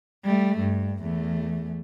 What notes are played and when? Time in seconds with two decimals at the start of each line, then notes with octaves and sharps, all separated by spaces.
0.25 G3 A3
0.58 G2
1.02 E2 A3